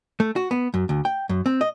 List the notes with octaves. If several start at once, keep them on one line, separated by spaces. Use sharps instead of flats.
A3
F#4
B3
F#2
D2
G5
F#2
C4
D#5